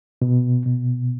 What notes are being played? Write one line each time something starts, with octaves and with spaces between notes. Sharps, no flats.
B2
B2